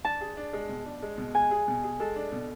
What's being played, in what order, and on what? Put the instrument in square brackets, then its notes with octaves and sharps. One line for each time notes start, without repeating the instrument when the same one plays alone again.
[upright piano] D4 [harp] A5
[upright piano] G#4
D4
G#3
B2
D4
G#3
B2
[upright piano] G#3 [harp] G#5
[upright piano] G#4
B2
G#4
[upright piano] G#3 [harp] A4
[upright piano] D4
B2